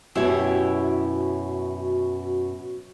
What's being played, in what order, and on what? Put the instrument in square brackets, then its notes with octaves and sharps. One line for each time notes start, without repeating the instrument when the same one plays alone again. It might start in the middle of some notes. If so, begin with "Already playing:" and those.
[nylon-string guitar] F#2 B2 [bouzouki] E4 G4 C#5 [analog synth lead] F#4